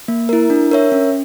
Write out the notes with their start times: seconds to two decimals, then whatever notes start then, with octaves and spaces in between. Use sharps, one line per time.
0.08 A#3
0.29 E4 A#4
0.50 D4
0.71 A#4 C#5 E5
0.92 C#4